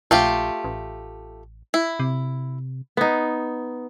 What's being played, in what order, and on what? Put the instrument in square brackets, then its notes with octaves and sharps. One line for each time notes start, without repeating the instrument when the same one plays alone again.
[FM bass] A#1 [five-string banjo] A3 F4 G4
[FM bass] A1
[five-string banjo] E4
[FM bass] C3
[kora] B3 D#4